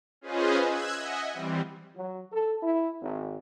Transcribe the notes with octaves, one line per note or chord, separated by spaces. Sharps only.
C#4 F4 G#4 B4 C5 D#5
E6 F#6 G#6
D#5 E5 F#5 G#5
E3 G3 C4
F#3
A4
E4
G#1